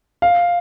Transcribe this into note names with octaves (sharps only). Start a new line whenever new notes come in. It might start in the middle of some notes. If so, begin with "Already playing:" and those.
F5